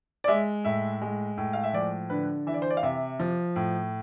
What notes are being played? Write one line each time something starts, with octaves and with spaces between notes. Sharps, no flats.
D5
G#3 E5
A2 E5
G#3
A2
F5
E5
F3 D5
D3 B4
E3 E5
D5
C5
D5
F5
C3 E5
F3
A2